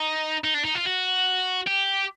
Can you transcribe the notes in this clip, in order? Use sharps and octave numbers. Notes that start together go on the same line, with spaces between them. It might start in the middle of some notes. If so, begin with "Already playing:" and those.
Already playing: D#4
D#4
D4
D#4
F4
F#4
G4